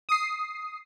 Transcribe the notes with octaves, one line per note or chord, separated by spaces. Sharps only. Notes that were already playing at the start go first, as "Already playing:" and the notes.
D#6 C7